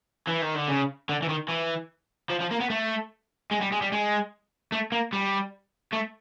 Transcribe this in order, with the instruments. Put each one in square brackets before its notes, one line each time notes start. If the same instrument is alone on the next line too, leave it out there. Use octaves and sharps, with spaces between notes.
[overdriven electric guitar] E3
D#3
D3
C#3
D3
E3
D#3
E3
F3
F3
A#3
B3
A3
G#3
G3
G#3
G3
G#3
A3
A#3
G3
A3